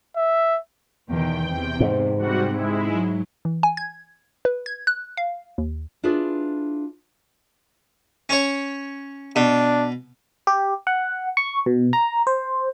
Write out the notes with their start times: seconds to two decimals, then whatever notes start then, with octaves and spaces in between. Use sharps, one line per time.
0.16 E5
1.08 E2 B2 D#3 G5
1.45 E2 C3
1.80 G#2
2.19 C3 G3 F#4 F#5
2.53 G#3 E4
2.91 F#3
3.45 E3
3.63 G#5
3.77 G#6
4.45 B4
4.66 G#6
4.87 F#6
5.17 F5
5.58 D#2
6.03 D4 E4 F4 G#4 B4
8.29 C#4 C#5
9.36 B2 D4
10.47 G4
10.87 F#5
11.37 C#6
11.66 B2
11.93 A#5
12.27 C5